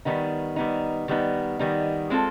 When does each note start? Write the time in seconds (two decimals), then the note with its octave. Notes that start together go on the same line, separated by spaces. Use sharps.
0.05 D#3 G3 B3 D#4
0.56 D#3 G3 B3 D#4
1.08 D#3 G3 B3 D#4
1.59 D#3 G3 B3 D#4
2.10 G#3 C4 F4 A4